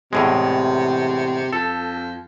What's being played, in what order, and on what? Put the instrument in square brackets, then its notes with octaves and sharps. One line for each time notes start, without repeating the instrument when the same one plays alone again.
[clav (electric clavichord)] E2 A2 G#3 [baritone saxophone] C3
[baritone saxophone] F2 [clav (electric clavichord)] A4